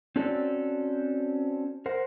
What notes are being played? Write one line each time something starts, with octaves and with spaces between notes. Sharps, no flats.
C4 C#4 F#4 A4 D5
A#4 C5 F#5